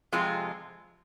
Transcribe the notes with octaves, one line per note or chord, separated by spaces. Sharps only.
F2 C3 G#3 F4